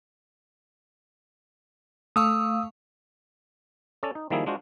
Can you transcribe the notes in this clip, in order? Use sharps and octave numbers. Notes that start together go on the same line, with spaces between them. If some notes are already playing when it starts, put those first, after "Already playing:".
A3 F5 C#6 D#6 E6
C#4 A4 D5
D#4
D#3 F3 G3 A#3 E4 G#4
G#3 D4 F4 F#4 C5